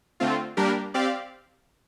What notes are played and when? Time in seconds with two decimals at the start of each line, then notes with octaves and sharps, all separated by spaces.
0.20 D3 A3 C4 F4
0.57 G3 A#3 D4 G4 A#4
0.94 C4 G4 D5 F5